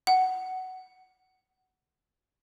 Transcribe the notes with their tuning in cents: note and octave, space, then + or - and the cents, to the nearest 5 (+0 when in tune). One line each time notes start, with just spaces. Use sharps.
F#5 +10